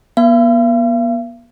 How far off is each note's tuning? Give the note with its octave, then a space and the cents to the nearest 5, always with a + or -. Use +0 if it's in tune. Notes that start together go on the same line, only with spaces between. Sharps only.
B3 -45 F5 -45